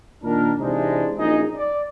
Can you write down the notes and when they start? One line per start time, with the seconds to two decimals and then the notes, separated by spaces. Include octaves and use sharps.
0.23 A#2 D#3 D4 A#4
0.60 C3 E3 G#3 D4 D#4
1.17 A#1 F#2 D#4 G#4 D#5
1.56 D5